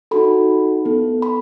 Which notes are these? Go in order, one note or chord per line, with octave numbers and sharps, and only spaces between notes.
D#4 F#4 A4 B5
B3 E4 A4
B5